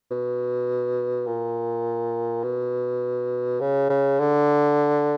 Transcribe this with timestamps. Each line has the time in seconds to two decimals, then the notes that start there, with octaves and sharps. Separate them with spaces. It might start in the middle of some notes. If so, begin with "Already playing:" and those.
0.11 B2
1.27 A#2
2.44 B2
3.61 C#3
3.90 C#3
4.20 D3